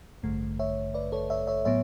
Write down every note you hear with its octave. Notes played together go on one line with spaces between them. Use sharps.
A1 G2 D3 A3
C#5 E5
B4 D5
A4 C#5
C#5 E5
C#5 E5
A2 F#3 B3 C#5 E5